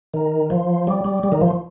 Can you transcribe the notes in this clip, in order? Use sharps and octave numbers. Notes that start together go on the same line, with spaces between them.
D#3
F3
G3
G3
G3
D#3
F3